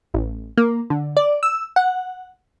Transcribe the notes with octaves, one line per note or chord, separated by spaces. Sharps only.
A1
A#3
D3
D5
E6
F#5